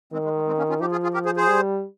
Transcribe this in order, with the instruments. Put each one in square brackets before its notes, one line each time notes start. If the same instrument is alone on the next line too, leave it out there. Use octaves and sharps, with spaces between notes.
[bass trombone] D#3 [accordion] G#3 C4
[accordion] G#3
G#3
G#3 C4
A#3 C#4
C#4 F4
[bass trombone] F3 [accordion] D#4 G4
[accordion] F4 G#4
F4 G#4
G4 A#4
G#4 C5
G#4 C5
[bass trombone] G3